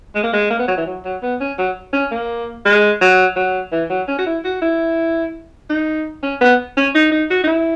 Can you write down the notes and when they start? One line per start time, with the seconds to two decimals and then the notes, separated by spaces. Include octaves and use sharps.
0.15 G#3
0.23 A#3
0.33 G#3
0.50 A#3
0.59 B3
0.68 F#3
0.77 E3
0.86 F#3
1.05 F#3
1.22 B3
1.40 C#4
1.58 F#3
1.93 C#4
2.11 A#3
2.66 G#3
3.01 F#3
3.36 F#3
3.72 E3
3.90 F#3
4.08 C#4
4.18 F#4
4.26 E4
4.44 F#4
4.62 E4
5.69 D#4
6.23 C#4
6.41 B3
6.77 C#4
6.95 D#4
7.12 D#4
7.30 F#4
7.44 D#4
7.47 E4